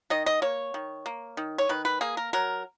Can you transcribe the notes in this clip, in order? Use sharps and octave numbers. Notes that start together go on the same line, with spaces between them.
D#3 D#5
D#5
A#3 C#5
D#3
A#3
D#3
C#5
D#3 B4
B4
A#3 G#4
A#4
F#3 A#4